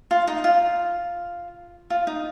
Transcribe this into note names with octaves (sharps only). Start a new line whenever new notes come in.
F4
D#4
F4
F4
D#4